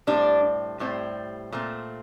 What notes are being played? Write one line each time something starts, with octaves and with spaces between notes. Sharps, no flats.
A2 G3 C4 D4
A2 G3 C4
A#2 A3 C4